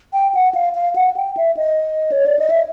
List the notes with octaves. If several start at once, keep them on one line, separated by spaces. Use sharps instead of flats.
G5
F#5
F5
F5
F#5
G5
E5
D#5
C#5
D5
D#5
E5